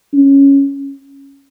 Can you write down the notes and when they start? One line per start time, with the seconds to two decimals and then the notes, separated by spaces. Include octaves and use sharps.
0.13 C#4